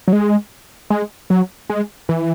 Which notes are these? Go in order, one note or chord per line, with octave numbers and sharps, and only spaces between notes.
F#3
G#3
G#3
F#3
G#3
E3